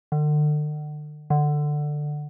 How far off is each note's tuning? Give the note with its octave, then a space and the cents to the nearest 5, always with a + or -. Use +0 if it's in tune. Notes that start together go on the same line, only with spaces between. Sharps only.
D3 +40
D3 +15